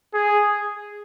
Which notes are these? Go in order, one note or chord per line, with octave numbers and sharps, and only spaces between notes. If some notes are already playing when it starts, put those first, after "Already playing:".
G#4